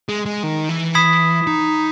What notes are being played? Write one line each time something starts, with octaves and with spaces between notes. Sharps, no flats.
G#3
G#3
D#3
E3
B5 D#6 G#6 B6 E7
D#4